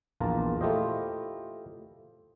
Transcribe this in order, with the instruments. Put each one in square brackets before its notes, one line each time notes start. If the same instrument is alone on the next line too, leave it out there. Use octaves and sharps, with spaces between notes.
[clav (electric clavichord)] A#1 E2 A#3 F4 A5 A#5
A3 E4 F4 G4 C5 D#5